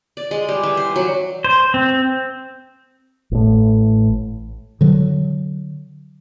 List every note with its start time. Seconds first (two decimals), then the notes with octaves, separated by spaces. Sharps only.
0.17 D5
0.31 G#3
0.49 G3
0.63 E3
0.77 C5
0.96 F#3
1.44 C5
1.74 C4
3.31 A1 A2
4.81 D3 F#3